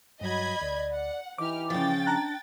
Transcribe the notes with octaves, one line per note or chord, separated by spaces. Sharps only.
G2 F#3 D#5 B5 G#6
D2 D5
F#5
E3 D#4 G4 D6 F6
C#3 F3 G5 A6
D4 A5 A#5 F#6